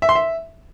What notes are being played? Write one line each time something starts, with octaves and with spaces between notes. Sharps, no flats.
E5
C6
E5